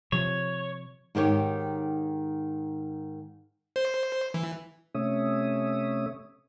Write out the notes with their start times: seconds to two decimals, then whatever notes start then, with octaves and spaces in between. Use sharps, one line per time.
0.12 C3 F3 C#5
1.15 G#2 D#3 G4 C#5
3.76 C5
4.34 E3
4.95 C3 A3 C#4 C#5 E5 D#6